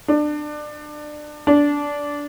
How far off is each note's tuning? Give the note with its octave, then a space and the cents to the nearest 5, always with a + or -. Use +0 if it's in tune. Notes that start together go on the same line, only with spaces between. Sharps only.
D4 +25
D4 -15